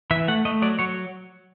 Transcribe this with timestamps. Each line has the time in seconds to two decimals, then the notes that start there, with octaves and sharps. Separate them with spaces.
0.11 E3 E5
0.28 A3 F#5
0.45 A3 D#5
0.62 F#3 D5
0.79 F#3 C#5